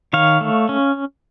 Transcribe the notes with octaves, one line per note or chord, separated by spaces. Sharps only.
D#3 C#5 F5
A3
C#4